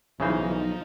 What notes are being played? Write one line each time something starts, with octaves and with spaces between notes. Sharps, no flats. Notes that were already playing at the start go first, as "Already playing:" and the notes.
B1 C#3 E3 F3 D#4 C5